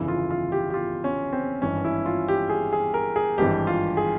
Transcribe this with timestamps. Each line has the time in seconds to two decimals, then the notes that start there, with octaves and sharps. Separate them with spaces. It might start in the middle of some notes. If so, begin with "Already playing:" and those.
Already playing: G1 F2 C#3 E3 E4
0.08 F4
0.31 F4
0.52 G4
0.70 G4
0.74 F4
1.04 C#4
1.33 C4
1.62 G#1 G2 E3 C#4
1.84 E4
2.06 F4
2.28 G4
2.50 G#4
2.73 G#4
2.94 A#4
3.16 G#4
3.38 G#1 G2 E3 G4
3.67 F4
3.97 G#4